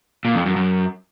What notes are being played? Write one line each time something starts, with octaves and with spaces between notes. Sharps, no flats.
A#2
F2
F#2
F#2